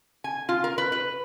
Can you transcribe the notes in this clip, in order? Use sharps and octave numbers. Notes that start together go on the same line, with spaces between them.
G#5
F4
A#4
B4
B4